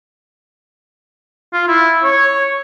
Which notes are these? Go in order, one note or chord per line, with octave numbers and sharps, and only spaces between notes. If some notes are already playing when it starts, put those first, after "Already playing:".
F4
E4
C#5